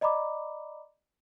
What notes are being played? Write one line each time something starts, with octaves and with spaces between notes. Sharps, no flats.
D5 D#5 A#5 B5 D6